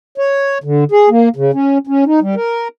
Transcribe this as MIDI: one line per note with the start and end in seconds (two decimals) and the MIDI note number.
0.18 0.58 73
0.64 0.84 50
0.92 1.09 68
1.10 1.29 58
1.36 1.51 49
1.54 1.78 61
1.87 2.04 61
2.06 2.20 63
2.21 2.35 55
2.35 2.68 70